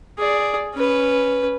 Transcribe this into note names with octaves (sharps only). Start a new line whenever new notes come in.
G#4 D5
C#4 B4